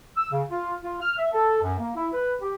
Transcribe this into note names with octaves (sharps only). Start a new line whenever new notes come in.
E6
C#3
F4
F4
F6
E5
A4
F#2
A#3
E4
B4
G4